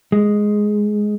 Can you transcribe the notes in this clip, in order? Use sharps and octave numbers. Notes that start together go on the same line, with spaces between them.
G#3